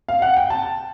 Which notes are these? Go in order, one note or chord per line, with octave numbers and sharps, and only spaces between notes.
F5
F#5
G5
A5